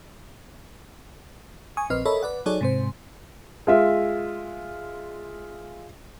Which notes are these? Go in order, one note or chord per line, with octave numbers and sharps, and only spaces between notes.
G#5 C#6 D#6
A#1 C4 B4 D#5 F6
A4 A#4 C#5 D#5 E5 B5
B4 D5 F#5
F#3 D#4 G#4 A4 C#5 D5
G#2 C3 C5
G#3 F4 E5